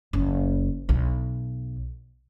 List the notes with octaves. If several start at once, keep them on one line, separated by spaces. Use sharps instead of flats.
F#1
B1